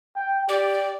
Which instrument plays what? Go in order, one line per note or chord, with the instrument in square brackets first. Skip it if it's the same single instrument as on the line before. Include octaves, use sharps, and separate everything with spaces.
[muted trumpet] G5
[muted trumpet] G4 [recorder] D5